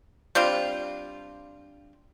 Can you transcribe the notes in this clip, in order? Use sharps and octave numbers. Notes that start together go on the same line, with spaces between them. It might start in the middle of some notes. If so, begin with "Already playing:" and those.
G3 C4 D4 F4